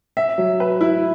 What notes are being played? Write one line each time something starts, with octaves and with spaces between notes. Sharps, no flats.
E5
F#3
B4
E4